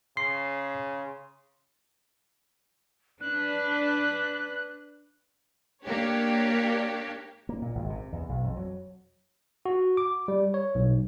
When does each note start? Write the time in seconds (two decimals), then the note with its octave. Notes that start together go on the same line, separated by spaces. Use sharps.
0.17 C#3 C6 C7
3.21 D4 B4 F#6
5.84 A#3 D4 G4 C#5
7.49 A#3
7.62 A#2
7.75 G#1
7.90 C3
8.12 E2
8.29 B1
8.44 F2
8.57 F#3
9.66 F#4
9.97 D6
10.28 G3
10.54 C#5
10.75 B1